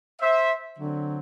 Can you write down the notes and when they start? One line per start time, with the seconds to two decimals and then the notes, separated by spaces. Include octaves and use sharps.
0.21 C5 E5
0.79 D3 F#3 C4